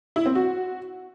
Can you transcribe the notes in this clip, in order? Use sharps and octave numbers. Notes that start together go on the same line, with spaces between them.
E4
C4
F#4